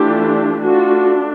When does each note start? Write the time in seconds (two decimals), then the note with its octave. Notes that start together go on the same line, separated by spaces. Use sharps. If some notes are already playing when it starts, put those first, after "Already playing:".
Already playing: E3 A3 D4 F4 G4
0.60 A3 D4 F4 F#4